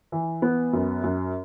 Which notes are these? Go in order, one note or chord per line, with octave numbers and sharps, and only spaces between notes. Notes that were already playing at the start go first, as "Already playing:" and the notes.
E3
B3
F#2
F#2